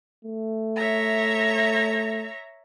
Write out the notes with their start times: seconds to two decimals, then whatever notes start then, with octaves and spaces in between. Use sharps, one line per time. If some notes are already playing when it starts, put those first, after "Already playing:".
0.25 A3
0.76 C#5 E5 A#5